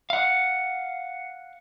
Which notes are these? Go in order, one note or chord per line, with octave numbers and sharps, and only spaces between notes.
F5 F#5